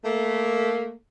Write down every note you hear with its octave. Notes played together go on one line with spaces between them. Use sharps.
A3 A#3